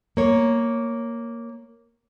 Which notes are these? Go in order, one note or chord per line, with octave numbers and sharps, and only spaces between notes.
A#3 C#5